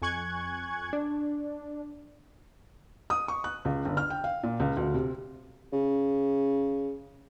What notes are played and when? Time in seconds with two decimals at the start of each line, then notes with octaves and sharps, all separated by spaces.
0.02 F2 G#5 C#6 F#6 G#6
0.93 D4
3.10 D#6
3.28 C#6
3.44 F#6
3.65 C#2
3.85 G1
3.97 F6
4.10 G5
4.24 F5
4.43 A#2
4.60 C#2
4.77 D2
4.94 C3
5.72 C#3